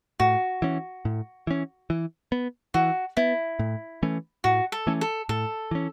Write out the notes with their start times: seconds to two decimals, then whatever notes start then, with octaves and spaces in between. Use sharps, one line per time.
0.20 A2 F#4
0.62 E3 C#4
1.05 A2
1.47 E3 C#4
1.90 E3
2.32 B3
2.74 E3 F#4
3.17 B3 E4
3.59 A2
4.03 E3 A3 C#4
4.44 A2 F#4
4.72 A4
4.87 E3 A3 C#4
5.01 A4
5.29 A2 A4
5.71 E3 C#4